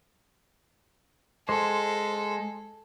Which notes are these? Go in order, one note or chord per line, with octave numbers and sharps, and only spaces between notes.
G#3 A4 C5